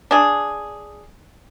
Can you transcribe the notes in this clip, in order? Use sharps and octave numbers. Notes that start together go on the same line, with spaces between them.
D4 G#4